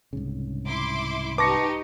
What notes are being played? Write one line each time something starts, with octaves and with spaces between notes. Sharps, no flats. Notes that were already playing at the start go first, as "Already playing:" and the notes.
C2 G#2 C#3
E4 C6 D6
D#4 G4 B4 A5 C#6 D6 A#6 C#7